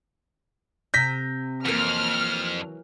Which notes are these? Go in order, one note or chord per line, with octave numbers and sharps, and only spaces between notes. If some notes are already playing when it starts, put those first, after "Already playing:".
C3 G6 A#6 B6
F2 E3 F#3 A#3 F6